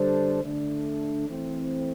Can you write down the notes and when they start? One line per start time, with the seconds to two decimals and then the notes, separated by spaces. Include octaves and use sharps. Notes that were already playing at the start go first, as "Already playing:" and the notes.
Already playing: D3 G3 D4 A4 C5
0.43 D3 A3 D4
1.29 E3 A3 C4